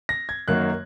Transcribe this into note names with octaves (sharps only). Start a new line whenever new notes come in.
A#6
G#6
F#2 D#3 F#3 A#3 F#6